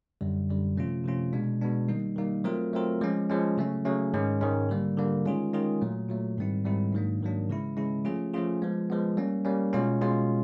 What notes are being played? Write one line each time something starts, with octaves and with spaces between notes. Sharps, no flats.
F#2 D3 G3
F#2 D3 G3
C3 F3 A3 C#4 F4
C3 F3 A3 C#4 F4
B2 G#3 B3 D4
B2 G#3 B3 D4
D#3 G3 A#3 D#4
D#3 G3 A#3 D#4
F#3 A3 C4 F4 A#4
F#3 A3 C4 F4 A#4
F3 G#3 C#4
F3 G#3 C#4
C#3 F#3 A3 C#4
C#3 F#3 A3 C#4
G#2 D#3 G#3 C#4
G#2 D#3 G#3 C#4
D3 G3 A#3
D3 G3 A#3
D#3 G#3 C#4 F4 G#4
D#3 G#3 C#4 F4 G#4
A#2 F#3 A3
A#2 F#3 A3
G#2 D#3 G3 C4 E4
G#2 D#3 G3 C4 E4
G#2 D#3 F#3 A#3 D4
G#2 D#3 F#3 A#3 D4
C#3 E3 G#3 C#4 E4
C#3 E3 G#3 C#4 E4
F3 A3 C#4 F4 G#4
F3 A3 C#4 F4 G#4
F3 G#3 B3
F3 G#3 B3
G3 A#3 C#4
G3 A#3 C#4
B2 G#3 C#4 F4
B2 G#3 C#4 F4